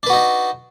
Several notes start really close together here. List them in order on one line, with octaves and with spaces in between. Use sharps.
D4 B4 F#4 D#4